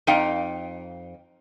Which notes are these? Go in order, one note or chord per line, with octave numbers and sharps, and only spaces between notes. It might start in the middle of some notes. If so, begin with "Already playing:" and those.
F2 D#4 F5 G5